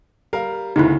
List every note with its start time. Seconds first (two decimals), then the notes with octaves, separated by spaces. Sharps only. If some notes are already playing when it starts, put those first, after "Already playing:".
0.33 G3 A#4 F5
0.76 G1 D2 C#3 D#4 E4